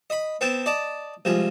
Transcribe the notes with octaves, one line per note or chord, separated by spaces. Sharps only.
D#5 B5
B3 C4 G5 A5
D5 D#5 A5
C2 F3 G#3